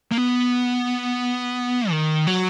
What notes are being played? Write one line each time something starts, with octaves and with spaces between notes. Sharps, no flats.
A#3
B3
D#3
F#3